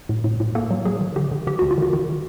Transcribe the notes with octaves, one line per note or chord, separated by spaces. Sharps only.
A2
A2
A2
A#3 A4
F#3
F#3 G#4
D#3
D3 G4
D3
D3 G4
D2 F#4
F4
D#3 F#4
D#3